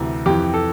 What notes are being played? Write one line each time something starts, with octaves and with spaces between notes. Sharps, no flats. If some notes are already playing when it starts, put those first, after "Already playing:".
Already playing: D2 C3 E3
F2 E3 G4
A4